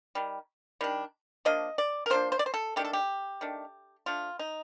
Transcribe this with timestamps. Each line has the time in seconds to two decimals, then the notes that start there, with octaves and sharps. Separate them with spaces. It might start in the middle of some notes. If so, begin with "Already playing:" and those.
0.15 D#3 G3
0.81 D#3 G3 D4
1.45 F3 A#3 D4 D#5
1.78 D5
2.06 A#4
2.10 F3 A#3 D4 C5
2.32 C5
2.39 D5
2.46 C5
2.54 A4
2.76 D#3 A3 D4 G4
2.85 A4
2.93 G4
3.41 D#3 A3 D4
4.06 F3 A3 D4 F4
4.39 D#4